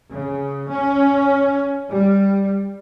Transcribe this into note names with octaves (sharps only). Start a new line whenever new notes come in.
C#3
C#4
G3